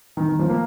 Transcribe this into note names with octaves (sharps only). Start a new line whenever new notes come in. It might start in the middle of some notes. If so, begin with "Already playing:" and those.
D#3
D#3
F3
A#3